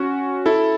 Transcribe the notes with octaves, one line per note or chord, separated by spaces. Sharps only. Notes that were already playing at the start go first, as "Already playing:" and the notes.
Already playing: C#4 F#4
E4 A4